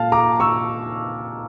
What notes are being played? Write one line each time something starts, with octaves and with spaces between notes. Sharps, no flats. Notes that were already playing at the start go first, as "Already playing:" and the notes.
Already playing: A#2 F5 A5
A#5 D6
C#6 E6